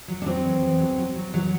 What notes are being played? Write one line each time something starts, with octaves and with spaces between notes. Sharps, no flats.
F#3
D4
F#3 C4
E2
E2
F#3
F#3
F#3
E2 F#3